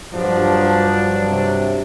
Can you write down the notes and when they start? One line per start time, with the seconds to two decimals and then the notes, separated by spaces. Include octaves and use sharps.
0.14 G2 F3 F#3 D4
1.29 C3